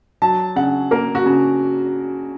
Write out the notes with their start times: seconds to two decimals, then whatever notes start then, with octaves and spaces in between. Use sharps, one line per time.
0.22 F#3 A5
0.56 C#3 F#5
0.91 A#3 A#4
1.15 F#4
1.26 C#3